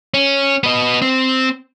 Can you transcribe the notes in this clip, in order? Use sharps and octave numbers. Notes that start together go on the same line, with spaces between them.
C#4
B3 D#5
C4